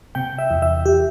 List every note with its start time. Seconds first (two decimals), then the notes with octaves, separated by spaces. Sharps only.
0.15 C3 G5
0.38 E5
0.51 E2
0.62 E5
0.86 G4